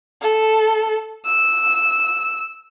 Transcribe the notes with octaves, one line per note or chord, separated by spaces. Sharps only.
A4
E6